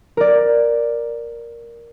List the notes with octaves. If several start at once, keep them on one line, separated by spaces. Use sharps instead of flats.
A#4 D5